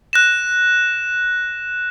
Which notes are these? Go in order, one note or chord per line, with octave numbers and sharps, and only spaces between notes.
F#6 A#6 E7